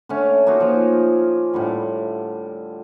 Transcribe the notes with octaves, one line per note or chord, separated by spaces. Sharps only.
D3 A3 C#4
A#3 D#4 F4 F#4
F3
A2 D3 G3